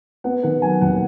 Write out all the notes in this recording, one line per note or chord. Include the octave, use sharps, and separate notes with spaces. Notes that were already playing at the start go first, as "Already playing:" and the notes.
B3 F#5
D#3 F#5
F#3 G#5
D#2 F#5